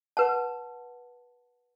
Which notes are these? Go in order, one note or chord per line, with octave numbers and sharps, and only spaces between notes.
B4 F#5 A5